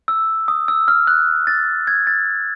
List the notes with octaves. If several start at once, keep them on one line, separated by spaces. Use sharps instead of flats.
E6
D#6
E6
F6
F#6
A6
G#6
A6